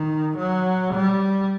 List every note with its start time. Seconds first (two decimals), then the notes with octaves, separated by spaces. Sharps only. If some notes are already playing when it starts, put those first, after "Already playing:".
Already playing: D#3
0.37 F#3
0.94 G3